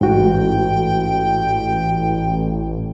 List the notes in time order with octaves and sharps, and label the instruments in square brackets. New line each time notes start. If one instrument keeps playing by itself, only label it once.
[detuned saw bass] A1 [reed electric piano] G#2 F#4 [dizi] G5